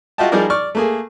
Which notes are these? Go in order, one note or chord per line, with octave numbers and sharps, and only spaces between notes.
F4 F#4 D#5 E5 G5 A5
F3 G3 D#4 G#4 A#4 D5
D5 C#6 F6
A3 A#3 G#4